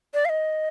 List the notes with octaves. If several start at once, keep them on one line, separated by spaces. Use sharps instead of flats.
D5
F5
D#5